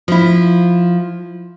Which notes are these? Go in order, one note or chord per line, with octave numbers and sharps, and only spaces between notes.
F3 E4